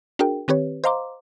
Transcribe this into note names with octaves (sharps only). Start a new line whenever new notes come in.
D4 F#4 G#4 A#4 G5
D#3 C4 G4 B4 C#5
C5 D#5 F5 A#5 C6 D6